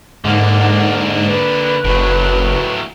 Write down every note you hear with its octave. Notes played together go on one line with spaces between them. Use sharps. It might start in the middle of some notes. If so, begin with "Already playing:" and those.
G#2 D3 A#3 F#5
B4
F#1 A2 F#3